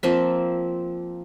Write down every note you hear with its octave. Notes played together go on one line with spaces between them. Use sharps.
F3 A#3 C4 E5